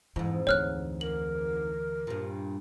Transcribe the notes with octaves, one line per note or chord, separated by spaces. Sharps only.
F2 G#2 E3
D2 E3 C#5 F6 F#6
A#4 F#7
G2 A#2